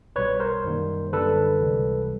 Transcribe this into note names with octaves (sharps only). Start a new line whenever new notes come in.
B1 B2 G3 B4 C#5
A#4 C5
F#2 D#3 G3 A#3
G1 F#2 D3 G3 A4 B4
C#2 C3 E3 G3